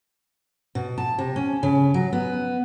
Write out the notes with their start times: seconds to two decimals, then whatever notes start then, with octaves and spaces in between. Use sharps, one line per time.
0.75 B2
0.98 A5
1.18 C3
1.36 C#4
1.63 C#3
1.94 F#3
2.13 B3